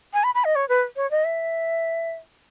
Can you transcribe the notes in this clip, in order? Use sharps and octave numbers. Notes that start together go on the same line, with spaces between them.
G#5
B5
B5
D#5
C#5
B4
C#5
D#5
E5